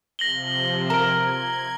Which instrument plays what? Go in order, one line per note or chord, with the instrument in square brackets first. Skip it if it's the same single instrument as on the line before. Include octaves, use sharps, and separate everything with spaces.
[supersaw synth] C3 F3 [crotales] A#6 F#7 G7
[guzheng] A#4 [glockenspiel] A#5 D7 [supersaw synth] G#6